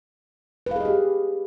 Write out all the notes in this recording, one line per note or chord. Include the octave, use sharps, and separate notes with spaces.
G4 G#4 B4 D#5 F5